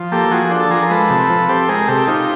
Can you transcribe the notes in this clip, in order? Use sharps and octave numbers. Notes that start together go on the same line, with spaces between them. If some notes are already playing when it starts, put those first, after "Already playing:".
Already playing: F3
A#3 G4 A4
F3 F#4 G#4
D4
A4
F3 G#4 A#4
A#4
G#3 A4 B4
C3
F3
C4 G4 A4
G#3 G#4 A#4
C3 G4 A4
D#4 F4 G4